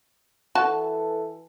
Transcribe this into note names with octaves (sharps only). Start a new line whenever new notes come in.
E3 F#4 A4 A5